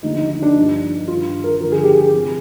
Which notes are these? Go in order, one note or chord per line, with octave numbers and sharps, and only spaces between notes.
D#2 D3 F3 D#4
D#4
D#4
D4
G2 F3 D#4
G2 D#3 F4
A#4
G2 D3 F3 A#4
G#4
G4
G#4
C3 F3